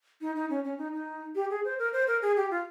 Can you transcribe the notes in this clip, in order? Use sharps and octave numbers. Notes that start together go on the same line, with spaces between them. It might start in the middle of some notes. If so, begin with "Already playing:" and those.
D#4
D#4
C#4
C#4
D#4
D#4
G4
G#4
C5
A#4
C5
A#4
G#4
G4
F4